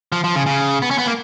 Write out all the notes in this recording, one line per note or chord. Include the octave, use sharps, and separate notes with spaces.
F3
F3
C#3
C#3
B3
C#4
B3
A#3